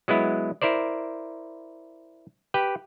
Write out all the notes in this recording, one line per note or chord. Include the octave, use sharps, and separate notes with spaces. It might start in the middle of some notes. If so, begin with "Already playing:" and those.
F#3 G#3 B3 E4
E4 A#4 C5 D5
G4 B4 G5